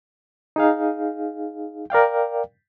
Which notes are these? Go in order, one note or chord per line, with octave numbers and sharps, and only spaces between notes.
D#4 G#4 F5
A#4 D5 F5 G5